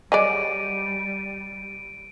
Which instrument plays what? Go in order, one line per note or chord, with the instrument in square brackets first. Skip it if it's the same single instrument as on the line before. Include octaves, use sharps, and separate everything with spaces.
[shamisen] F#3 G#4 D5 [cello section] G3 [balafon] D#5 [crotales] D7 D#7